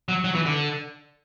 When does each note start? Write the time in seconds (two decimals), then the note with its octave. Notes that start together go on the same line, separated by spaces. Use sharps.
0.09 F#3
0.24 F#3
0.35 E3
0.46 D3